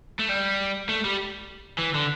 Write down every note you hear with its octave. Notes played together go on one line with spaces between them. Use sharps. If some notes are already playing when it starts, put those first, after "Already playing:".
A3
G3
A3
G3
E3
D3